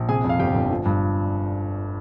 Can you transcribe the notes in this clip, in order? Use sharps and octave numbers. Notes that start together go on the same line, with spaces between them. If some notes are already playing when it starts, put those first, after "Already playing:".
Already playing: A#1
C3 G#4 G#5
F2
F5
G1 G4 G5
G1
F3
G2